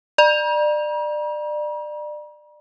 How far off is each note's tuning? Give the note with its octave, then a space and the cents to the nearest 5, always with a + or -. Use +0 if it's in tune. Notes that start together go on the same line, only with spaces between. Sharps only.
D5 +30 A#5 +45